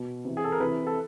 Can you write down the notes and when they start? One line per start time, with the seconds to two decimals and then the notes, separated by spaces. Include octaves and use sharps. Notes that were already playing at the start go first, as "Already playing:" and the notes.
Already playing: B2
0.25 C3 E3
0.37 G#4
0.44 A4
0.52 A#4
0.60 C3 E3 B4
0.87 A4